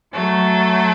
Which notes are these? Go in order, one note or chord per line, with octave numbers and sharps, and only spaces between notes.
F#3 A3